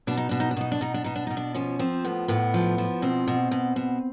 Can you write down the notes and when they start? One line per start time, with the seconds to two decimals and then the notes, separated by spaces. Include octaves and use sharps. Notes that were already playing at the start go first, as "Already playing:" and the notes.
0.07 B2 D4
0.17 D#4
0.29 B2 D4
0.40 D#4
0.51 D4
0.57 B2 D#4
0.72 D4
0.81 B2 D#4
0.94 D4
1.04 B2 D#4
1.16 D4
1.27 B2 D#4
1.37 D4
1.54 F3 C#4
1.79 F3 C4
2.04 A2 B3
2.28 A2 B3
2.54 F3
2.78 F3
3.02 B2 C4
3.27 B2
3.51 B2
3.76 B2